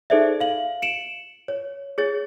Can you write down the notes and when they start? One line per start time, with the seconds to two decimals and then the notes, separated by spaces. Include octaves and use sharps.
0.10 D#4 G#4 A4 C5 D5 E5
0.40 F5 F#7
0.82 C#7 D7 E7 F#7
1.48 C#5
1.98 G#4 C#5 A6